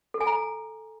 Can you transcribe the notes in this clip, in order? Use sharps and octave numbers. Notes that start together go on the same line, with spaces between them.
A4
G#5
A#5